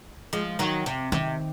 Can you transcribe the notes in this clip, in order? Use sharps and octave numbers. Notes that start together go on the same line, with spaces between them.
F3 G#3
D#3 F#3
C3
C3 D#3